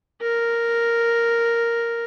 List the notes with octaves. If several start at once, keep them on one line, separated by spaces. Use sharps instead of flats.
A#4